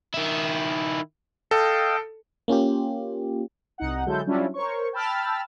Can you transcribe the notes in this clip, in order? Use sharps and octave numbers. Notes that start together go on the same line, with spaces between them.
D#3 E4
A4 D#5 F5 G5
A#3 C#4 F4 G4
C2 D#4 F#5
D3 F#3 G#3 E4 A4 G6
F#3 G3 C#4 D4 E4 F4
A#4 C5 C#5 C#6
G5 A5 B5 E6 F6 A6